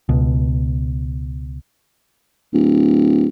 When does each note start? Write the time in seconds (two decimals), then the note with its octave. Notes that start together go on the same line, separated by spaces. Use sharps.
0.09 C#2 B2
2.53 D1